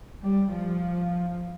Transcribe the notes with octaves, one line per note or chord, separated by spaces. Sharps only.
G3
F3